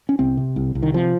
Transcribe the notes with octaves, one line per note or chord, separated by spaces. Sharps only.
C#4
C2 C4
C3
C2
C2
D#3
C3 F3